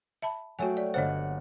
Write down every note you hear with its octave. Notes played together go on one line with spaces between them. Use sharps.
E5 A5 B5
F#3 A3 F#4 C#5 G5 G#5
D5
G1 A#3 C5 C#5 D#5 F#5